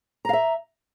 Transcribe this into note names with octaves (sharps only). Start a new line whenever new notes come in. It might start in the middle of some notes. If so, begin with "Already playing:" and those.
E5 F5 A#5